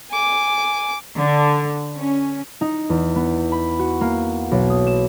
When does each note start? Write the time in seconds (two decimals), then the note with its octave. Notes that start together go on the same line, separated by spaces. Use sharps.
0.10 G#5 D6
1.17 D3
1.96 C#4
2.61 D#4
2.90 E2
3.16 B3
3.52 B5
3.79 F#4
4.01 A#3
4.51 B1
4.70 D#6
4.87 E7